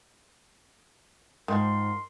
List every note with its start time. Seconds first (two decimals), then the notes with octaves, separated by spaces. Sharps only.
1.48 G#2 D#3 F3 A#4 C6